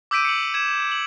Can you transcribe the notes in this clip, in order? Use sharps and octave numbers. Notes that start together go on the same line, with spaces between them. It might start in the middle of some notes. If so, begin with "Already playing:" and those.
D6 E6 G6 B6 D7 D#7
C#7 F#7
G#6 E7
F#7